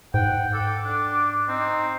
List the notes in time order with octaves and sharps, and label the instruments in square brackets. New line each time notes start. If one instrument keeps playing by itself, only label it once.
[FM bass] G#2 [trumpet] F#5 [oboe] G5
[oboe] A4 [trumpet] D6
[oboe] D4
[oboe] C4 [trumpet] D#4